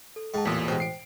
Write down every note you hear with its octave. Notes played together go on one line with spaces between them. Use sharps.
A4
G#2 G5 A5
A1 E2 A#2 D#6 B6
B2 G#3 C5 G5
C7 D7